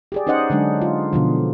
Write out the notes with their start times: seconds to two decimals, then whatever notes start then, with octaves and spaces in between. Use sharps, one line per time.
0.12 G4 G#4 D5
0.27 C#4 D#4 C5 D#5 F#5
0.50 D3 F#3 G#3 D4
0.82 F4
1.13 B2 D3 F3